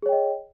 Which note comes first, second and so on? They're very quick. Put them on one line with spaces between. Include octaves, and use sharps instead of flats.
G#4 C#5 G5 D#5